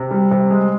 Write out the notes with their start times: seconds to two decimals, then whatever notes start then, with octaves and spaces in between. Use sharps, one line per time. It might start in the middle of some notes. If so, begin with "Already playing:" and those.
Already playing: C3
0.11 G3
0.31 C3
0.50 G#3